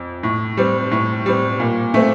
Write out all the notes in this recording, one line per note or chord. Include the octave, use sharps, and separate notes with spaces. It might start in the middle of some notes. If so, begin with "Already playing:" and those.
Already playing: F2
A2
G3 C4
A2
G3 C4
A#2
A3 C4